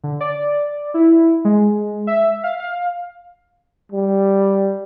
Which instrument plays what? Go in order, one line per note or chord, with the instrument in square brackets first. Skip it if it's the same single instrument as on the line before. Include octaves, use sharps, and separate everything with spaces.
[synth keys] D3
D5
E4
G#3
E5
F5
F5
[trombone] G3